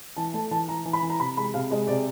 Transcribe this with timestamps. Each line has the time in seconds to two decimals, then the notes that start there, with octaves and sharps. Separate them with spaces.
0.17 E3 A5
0.33 A3 A5
0.51 E3 A5
0.69 E3 A#5
0.85 E3
0.93 B5
1.02 E3
1.10 A#5
1.19 C3 B5
1.37 G#3 B5
1.54 C3 F5
1.71 G#3 D#5
1.87 C3 D5